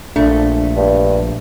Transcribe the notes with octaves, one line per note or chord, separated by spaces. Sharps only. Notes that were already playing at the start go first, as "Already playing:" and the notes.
A#1 A3 D4
G2